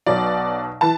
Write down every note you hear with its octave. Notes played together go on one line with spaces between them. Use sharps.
B1 B2 F#3 D5
E3 A5